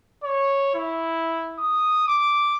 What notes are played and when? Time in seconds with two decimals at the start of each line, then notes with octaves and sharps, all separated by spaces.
0.24 C#5
0.74 E4
1.59 D#6
2.08 D6